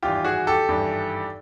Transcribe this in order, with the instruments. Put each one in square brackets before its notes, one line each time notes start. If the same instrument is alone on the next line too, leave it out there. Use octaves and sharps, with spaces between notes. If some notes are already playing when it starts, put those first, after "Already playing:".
[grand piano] G#1 G2 E3 F4 G4
F#4 G#4
G4 A4
G#1 G2 E3